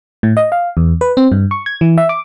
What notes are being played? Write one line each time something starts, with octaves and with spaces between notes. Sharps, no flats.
A2
D#5
F5
E2
B4
C4
G2
C#6
G#6
E3
E5
D6